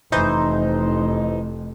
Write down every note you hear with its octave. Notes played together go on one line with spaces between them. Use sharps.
F1 E3 D#4 C5